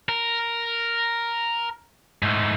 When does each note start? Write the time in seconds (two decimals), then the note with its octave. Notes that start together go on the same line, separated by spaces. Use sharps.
0.09 A#4
2.23 G#2 A3